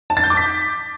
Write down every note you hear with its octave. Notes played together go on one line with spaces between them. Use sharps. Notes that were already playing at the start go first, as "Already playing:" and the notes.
A5
A6
G6
D6
B6